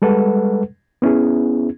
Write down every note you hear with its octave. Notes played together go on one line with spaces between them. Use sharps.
G3 G#3 A4 B4 F#5
B3 C#4 E4 G#4